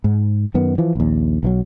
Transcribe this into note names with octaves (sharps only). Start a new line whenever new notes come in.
G#2
F#2 D#3 B3
E3 F3
A#1 D#2
B1 D#3 F#3